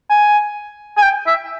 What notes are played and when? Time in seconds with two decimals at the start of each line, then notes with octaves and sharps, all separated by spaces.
0.10 G#5
0.97 G#5
1.03 G5
1.27 E5